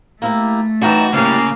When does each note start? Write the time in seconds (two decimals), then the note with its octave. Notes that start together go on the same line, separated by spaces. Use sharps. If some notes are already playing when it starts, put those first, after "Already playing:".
0.22 A3 A#3 E4 G4
0.82 F#2 E3 D#4 F#4 G5 A5
1.13 A2 C#3 G3 A#3 F5